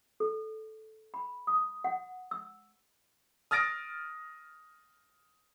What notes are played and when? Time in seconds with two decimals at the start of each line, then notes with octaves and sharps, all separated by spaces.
0.20 A4
1.14 B5
1.47 D#6
1.84 F#5
2.31 E6
3.51 D#6 F6 A6 A#6 D7